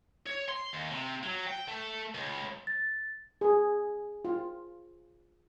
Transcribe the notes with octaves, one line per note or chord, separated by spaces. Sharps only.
C#5
C6
D#2
C3
F#3
G5
A3
C#2
A6
G#4
F4